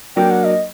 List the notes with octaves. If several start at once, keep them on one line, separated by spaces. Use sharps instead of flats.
F#3 A#3 D4 G5
F#5
D#5